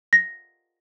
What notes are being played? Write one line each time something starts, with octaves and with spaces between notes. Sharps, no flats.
A#6